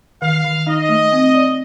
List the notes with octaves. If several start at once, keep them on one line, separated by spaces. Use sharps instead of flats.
D#3 F5
D#3
D#4 D#5
A3
C4
D5